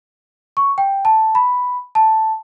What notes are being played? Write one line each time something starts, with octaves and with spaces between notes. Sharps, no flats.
C#6
G5
A5
B5
A5